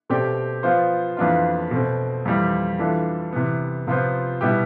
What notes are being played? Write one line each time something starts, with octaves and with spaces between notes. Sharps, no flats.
B2 A3 C4 G4 D5
F3 B3 F4 C5
F2 E3 B3 D4 F4
B2 A3 C4
F2 E3 G3
E3 G3 D4 F4 A4
C3 E3 B3
C3 F3 B3 F4 C5
B2 G3 B3 E4 G4